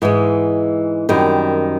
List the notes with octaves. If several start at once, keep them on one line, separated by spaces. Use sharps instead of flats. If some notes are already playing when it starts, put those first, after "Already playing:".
G#2 E3 G#3
F#2 D#3 G3 C4